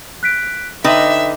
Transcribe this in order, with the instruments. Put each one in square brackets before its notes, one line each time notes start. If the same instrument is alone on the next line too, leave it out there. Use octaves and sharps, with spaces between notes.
[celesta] F#6 B6 D7
[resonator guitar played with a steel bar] D3 D#4 B4 [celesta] D#5 G5 D#6 [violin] E5